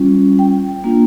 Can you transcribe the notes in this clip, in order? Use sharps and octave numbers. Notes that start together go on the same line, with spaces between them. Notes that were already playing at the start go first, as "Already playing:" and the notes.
Already playing: G3 C#4 F4
G5
A#3 D4 F4